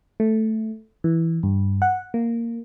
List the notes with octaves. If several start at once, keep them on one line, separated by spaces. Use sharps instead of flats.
A3
E3
G2
F#5
A#3